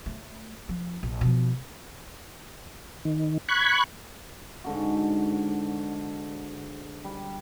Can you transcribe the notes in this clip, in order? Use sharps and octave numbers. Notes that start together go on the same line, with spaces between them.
A3
F3
A#1
B2 F3
D#3
B5 C#6 F#6 G#6
G#2 D3 F#4
G3